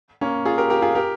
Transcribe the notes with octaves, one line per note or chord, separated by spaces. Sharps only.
A#3 C#4
F4 G#4
G4 A#4
G4 A#4
F4 G#4
G4 A#4